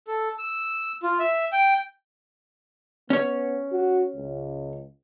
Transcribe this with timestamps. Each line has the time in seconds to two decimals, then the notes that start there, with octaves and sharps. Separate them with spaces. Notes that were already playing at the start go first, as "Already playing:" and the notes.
0.07 A4
0.38 E6
1.03 F4
1.19 E5
1.52 G5
3.10 B3 C#4 C#5
3.72 F#4
4.15 C#2